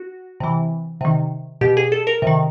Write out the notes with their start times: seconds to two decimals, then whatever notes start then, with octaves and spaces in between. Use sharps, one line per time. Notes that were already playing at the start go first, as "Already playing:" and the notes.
Already playing: F#4
0.40 C3 E3
1.01 C3 D#3
1.61 B2 G4
1.77 G#4
1.92 A4
2.07 A#4
2.22 C3 D#3